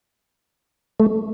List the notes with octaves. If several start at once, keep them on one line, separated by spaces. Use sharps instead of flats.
A3